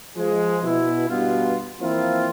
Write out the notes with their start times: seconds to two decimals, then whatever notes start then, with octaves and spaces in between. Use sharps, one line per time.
0.17 F3 G#3
0.63 B2 E4
1.08 G2 B2 B3 F4
1.81 E3 F3 A#3 C4 E4 F4